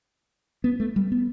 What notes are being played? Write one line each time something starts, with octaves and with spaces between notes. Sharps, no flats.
B3
A3
G3
B3